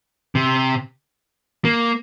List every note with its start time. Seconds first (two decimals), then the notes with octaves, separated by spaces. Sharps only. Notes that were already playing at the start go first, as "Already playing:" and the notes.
0.35 C3
1.65 A#3